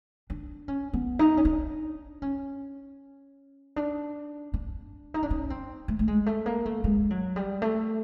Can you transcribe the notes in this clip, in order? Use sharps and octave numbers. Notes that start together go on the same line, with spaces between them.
D4
C#4
B3
D#4
C#4
D4
C#4
D4
D4
D#4
D4
C#4
C4
A3
A3
G#3
A3
A#3
A3
G#3
F#3
G3
A3